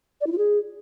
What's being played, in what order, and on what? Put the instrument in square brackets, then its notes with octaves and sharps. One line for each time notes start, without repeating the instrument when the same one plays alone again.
[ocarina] D5
E4
F4
G#4